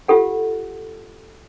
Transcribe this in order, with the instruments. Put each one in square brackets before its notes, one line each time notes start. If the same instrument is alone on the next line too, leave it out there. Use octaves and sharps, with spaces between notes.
[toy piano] F4 G4 A4 F#5